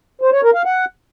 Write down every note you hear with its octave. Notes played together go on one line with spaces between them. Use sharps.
C5
C#5
A#4
F5
F#5